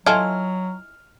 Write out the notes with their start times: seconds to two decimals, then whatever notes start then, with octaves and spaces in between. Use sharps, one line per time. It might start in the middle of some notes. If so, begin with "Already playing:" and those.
0.06 F#3 E4 F4 A4 D#5 G#5 F6 G#6